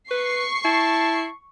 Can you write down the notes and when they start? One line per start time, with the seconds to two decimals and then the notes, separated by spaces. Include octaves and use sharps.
0.11 B4 C#6 C7
0.65 E4 A5